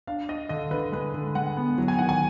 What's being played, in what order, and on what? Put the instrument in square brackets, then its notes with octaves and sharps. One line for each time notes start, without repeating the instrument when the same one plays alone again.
[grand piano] D4 F5
D4 D#5
D3 D#5
D3 B4
G#3 B4
D3
G#3 F#5
B3
F#3
G#5
D#3 F#5
G#5